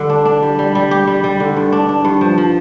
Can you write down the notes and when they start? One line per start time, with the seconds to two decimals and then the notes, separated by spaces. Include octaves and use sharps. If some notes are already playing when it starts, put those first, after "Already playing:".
Already playing: D3 G3
0.10 D4
0.25 D4
0.42 G3
0.59 G3
0.75 G3
0.91 G4
1.07 G3
1.24 G3
1.40 D3
1.56 G2
1.72 D4
1.89 D4
2.05 G2
2.21 F3
2.38 F3